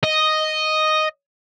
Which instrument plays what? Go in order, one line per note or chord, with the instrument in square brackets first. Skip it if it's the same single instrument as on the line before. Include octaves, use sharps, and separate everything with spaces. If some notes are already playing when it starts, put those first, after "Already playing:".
[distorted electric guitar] D#5